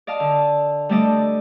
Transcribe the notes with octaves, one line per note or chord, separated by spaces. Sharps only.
D5 D#5 F5 A5
D3
G3 A3 D4 A4 D5 D#5